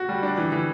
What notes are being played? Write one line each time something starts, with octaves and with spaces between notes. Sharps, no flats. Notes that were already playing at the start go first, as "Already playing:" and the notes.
Already playing: F#4
G3
D4
E3
E3